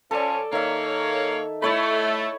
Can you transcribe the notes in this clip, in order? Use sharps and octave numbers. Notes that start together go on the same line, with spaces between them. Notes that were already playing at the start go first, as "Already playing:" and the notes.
F3 C#4 A4 D5
D#3 A#3 C#5 E5
A3 E4 C#5 B5